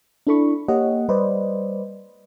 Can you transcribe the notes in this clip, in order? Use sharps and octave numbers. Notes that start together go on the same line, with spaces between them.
D4 E4 A4 B5 C#6
A#3 G4 C#5 D#5 F#5
G3 B4 C5 D5 D#5